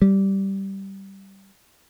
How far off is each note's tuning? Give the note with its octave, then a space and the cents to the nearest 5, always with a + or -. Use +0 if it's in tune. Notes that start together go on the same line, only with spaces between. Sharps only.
G3 -10